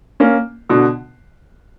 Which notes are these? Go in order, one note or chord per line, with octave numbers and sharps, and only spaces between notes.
A#3 C#4
B2 D3